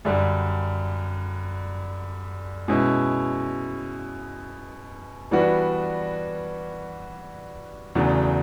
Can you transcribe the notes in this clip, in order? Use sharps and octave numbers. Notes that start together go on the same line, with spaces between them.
F#2 D3 G3
B2 G#3 C#4 E4
E3 G3 B3 D4 F#4
E2 C#3 F#3 A3 D4